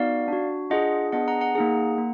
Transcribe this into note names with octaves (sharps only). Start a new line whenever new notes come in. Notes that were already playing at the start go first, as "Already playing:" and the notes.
Already playing: B3 D#4 F#4 D5 F5
D4 F#4
D4 F4 G#4 D#5 F#5
B3 D4 G#4 D#5 F#5
F#5 A#5
F#5 A#5
A#3 D#4 G#4
A#3